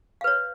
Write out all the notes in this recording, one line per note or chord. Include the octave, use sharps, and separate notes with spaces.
B4 C#5 F5